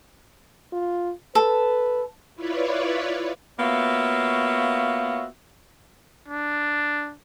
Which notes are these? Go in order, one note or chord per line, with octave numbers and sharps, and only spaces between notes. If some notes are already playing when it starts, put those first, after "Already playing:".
F4
A4 B4
E4 F4 B4 C#5 D5
A#3 B3 F4 F#4 C#5 E5
D4